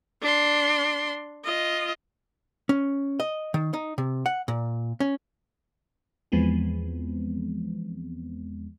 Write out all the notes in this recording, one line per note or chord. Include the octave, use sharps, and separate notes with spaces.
D4 C6
F4 D#5
C#4
D#5
D#3
D#4
C3
F#5
A#2
C#4
E2 E3 F3 G#3 B3 C4